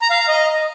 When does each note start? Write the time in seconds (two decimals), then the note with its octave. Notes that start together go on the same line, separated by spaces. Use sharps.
0.02 A#5
0.10 F5
0.19 A#5
0.28 D#5